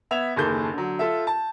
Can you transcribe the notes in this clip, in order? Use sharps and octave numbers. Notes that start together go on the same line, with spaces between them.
B3 E5 G#6 F7
F#1 D#2 G#4 A4 G6
D3 F#3
F4 A4 E5
A5